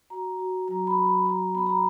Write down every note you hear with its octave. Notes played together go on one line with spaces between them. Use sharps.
F#4 A#5
F#4
F#3 A#5
B5
F#3
B5
F#4 A#5
B3 B5
A#5